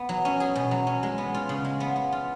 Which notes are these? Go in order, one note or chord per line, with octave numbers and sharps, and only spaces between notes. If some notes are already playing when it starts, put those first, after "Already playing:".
Already playing: B3
F#3
C#4
G#4
B2
F#3
C#4
G#3
B3
F4
C#3
G#3
B3
B3
F4